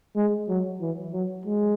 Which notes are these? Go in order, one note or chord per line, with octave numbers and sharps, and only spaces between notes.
G#3
F#3
E3
F#3
G#3